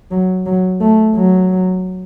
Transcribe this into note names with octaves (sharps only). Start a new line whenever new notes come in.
F#3
F#3
A3
F#3